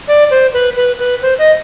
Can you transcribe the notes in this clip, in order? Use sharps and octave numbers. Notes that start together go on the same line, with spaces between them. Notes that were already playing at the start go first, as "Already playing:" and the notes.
D5
C5
B4
B4
B4
C5
D#5